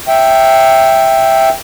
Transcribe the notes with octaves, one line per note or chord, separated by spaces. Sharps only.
E5 G5